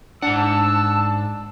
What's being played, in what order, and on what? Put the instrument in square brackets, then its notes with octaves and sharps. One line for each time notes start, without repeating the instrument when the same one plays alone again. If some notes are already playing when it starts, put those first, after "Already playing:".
[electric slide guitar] G#2 F#5 [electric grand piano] D4 [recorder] A5 [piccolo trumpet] E6